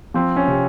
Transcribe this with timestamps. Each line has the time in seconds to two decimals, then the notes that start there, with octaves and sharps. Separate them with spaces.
0.14 F3 C4
0.36 C#4
0.47 C3